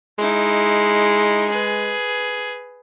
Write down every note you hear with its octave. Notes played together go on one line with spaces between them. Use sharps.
G#3 D#4 E4
G#4 B4